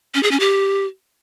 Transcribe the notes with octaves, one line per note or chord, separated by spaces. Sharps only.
C#4
G#4
C#4
G4